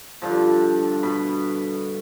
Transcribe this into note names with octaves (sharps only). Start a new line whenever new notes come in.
G2 D3 F3
B2 B5